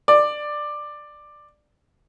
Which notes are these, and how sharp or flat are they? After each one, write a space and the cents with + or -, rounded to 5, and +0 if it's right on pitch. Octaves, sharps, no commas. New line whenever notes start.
D5 +15